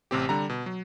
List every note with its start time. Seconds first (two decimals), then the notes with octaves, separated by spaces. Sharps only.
0.11 A1 C3 C4 G4
0.29 D3 G3 A#5
0.49 B2
0.66 F#3